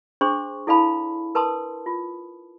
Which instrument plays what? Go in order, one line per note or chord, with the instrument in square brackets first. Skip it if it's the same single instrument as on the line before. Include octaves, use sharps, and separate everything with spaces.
[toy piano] D4 G#4 C5 C6 C#6
E4 A4 D5 F5 A5 B5
A#4 B4 A5 C6 D#6
F4